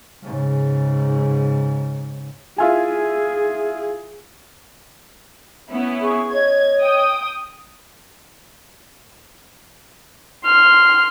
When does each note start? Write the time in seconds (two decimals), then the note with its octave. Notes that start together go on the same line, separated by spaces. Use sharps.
0.23 G#2 C#3
2.58 E4 F4 G#4 G#5
5.70 B3 C#4 E4
6.01 G#4 C#6
6.32 C#5 D#5 G#6
6.81 G5 D#6
10.45 C6 F6